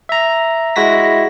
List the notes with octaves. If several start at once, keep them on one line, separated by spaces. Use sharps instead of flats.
E5 A#5
G#3 E4 F#4 A#6 B6